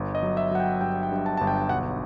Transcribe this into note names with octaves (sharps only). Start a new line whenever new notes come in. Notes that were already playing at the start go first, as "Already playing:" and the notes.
Already playing: G1
D#5
F#3
E5
F#3 F#5
G5
G2 G5
G5
G2
A5
G1 A5
G5
B1 F#5